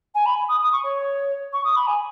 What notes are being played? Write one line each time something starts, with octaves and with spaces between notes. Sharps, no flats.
G#5
B5
D#6
D#6
C#6
C#5
C#6
D#6
B5
G#5